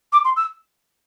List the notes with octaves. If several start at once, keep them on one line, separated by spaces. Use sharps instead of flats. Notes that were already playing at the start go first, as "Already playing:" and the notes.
D6
C6
E6